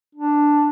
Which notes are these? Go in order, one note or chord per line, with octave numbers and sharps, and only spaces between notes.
D4